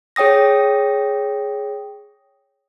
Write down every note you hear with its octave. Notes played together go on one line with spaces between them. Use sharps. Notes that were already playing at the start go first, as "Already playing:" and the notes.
G#4 C#5 G5 D#6 A#6